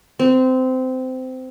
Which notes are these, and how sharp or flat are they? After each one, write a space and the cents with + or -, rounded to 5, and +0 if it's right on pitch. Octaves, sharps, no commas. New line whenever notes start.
C4 -20